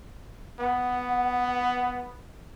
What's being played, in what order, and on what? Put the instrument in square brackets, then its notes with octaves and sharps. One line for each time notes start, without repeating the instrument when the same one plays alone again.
[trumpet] B3 [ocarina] F#5